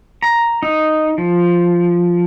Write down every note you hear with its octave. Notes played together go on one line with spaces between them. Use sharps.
A#5
D#4
F3